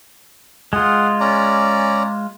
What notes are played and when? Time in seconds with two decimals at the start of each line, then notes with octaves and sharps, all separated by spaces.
0.73 G#3 F4 G#4 F#5
1.20 C#4 D5 A#5